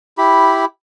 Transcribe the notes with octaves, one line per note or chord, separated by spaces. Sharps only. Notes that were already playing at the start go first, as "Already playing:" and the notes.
E4 G4 B5